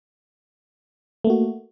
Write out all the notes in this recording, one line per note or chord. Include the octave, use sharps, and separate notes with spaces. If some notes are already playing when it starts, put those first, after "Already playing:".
A3 A#3 F#4